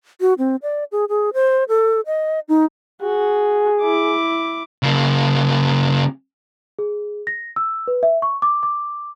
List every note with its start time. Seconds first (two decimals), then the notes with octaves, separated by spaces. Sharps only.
0.21 F#4
0.38 C4
0.63 D5
0.92 G#4
1.09 G#4
1.34 C5
1.69 A4
2.06 D#5
2.49 D#4
3.02 F#4 G#4
3.82 E4 D6
4.83 C#3 A#3
6.79 G#4
7.27 A#6
7.56 E6
7.88 B4
8.03 E5
8.22 C#6
8.42 D6
8.63 D6